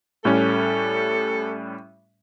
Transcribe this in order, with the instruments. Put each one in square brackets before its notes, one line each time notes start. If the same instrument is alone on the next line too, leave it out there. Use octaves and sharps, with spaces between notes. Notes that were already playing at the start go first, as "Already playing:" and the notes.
[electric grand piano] A2 G3 C#4 [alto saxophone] A4